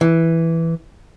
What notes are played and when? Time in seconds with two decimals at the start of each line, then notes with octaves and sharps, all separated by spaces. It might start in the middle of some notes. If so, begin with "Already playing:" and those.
0.01 E3